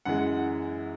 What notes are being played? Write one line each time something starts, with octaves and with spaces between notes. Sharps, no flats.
F#2 E3 G#3 F#5
F#5